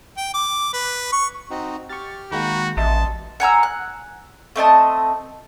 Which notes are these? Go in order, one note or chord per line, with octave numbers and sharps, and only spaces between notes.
G5
D6
B4
C#6
C4 D#4 F#4
G4 C#6 F6 A6
D#3 G#3 A#3 F#4 G5 A#5 B5
A1 D#5 E5 A5 C6 D#6
F#5 G#5 A#5 E6
F#6
A3 C4 D#5 A5